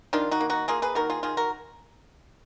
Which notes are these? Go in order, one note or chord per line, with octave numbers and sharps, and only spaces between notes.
D#3 D4 F4
D#4 F#4
A#3
D#4 F#4
A#3 F4 G#4
G#4 B4
D#3 F#4 A#4
F4 G#4
D#3 F4 G#4
F#4 A#4